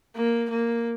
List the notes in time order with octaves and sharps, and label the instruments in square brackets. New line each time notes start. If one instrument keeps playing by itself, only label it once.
[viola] A#3
A#3